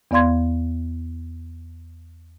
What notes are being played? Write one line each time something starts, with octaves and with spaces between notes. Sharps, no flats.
E2 B3 D5 F5 C6 G#6